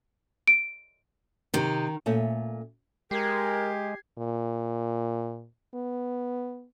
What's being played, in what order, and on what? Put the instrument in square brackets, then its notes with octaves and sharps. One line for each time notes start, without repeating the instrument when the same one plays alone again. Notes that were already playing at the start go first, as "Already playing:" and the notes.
[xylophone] D7
[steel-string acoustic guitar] C3 D#4 [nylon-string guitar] D#3
[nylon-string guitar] A#2 A3 C#4
[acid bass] G#3 [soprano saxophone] G4 [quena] A#4 [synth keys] G#6 C7
[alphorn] A#2
B3